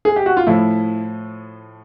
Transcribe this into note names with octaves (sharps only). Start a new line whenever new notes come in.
G#4
G4
F#4
F4
A2 F3 E4